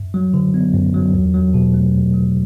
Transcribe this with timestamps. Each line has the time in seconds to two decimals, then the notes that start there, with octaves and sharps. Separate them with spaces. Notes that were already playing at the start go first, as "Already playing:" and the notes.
Already playing: F#2
0.14 F#3
0.34 D3
0.54 B3
0.74 F#2
0.94 F#3
1.15 E2
1.34 F#3
1.54 B2
1.74 A3
1.94 E2
2.14 F#3